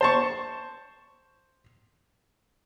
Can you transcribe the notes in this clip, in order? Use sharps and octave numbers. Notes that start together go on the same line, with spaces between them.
C5 A5 C#6